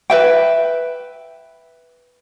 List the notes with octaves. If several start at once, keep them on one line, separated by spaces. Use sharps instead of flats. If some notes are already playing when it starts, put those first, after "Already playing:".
B4 E5 G5